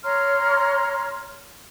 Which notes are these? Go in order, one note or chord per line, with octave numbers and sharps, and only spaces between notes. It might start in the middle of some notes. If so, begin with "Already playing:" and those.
C#5 A#5 C6 F6